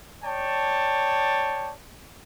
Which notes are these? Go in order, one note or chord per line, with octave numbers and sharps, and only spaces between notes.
C#5 D5 G5 A5